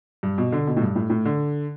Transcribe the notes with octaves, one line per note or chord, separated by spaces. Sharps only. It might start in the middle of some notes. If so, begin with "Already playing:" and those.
G2
B2
D3
B2
A2
G2
A2
A2
D3